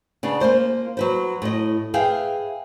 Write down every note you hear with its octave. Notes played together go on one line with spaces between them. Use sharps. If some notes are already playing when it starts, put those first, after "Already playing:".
C#3 B3 D4
A#3 F4 C5
F#3 B4 C5
A2 D#5
G#4 B4 E5 F5 G5